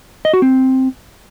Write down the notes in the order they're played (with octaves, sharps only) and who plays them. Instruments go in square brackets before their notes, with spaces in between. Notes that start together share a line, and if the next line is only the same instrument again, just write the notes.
[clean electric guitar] D#5
F#4
C4